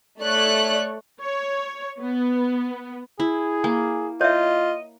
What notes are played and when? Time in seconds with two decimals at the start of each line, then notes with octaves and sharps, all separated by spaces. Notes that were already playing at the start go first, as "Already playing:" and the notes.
0.22 A3 C#5 D5 F#6
1.20 C#5
2.00 B3
3.20 E4 G#4
3.64 A#3 G#5
4.21 F4 C#5 D#5 E5